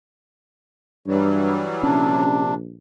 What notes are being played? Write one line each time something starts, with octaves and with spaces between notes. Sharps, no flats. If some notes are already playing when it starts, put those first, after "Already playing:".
G2 E3 F#3 G3
A#1 C3 C#4 D4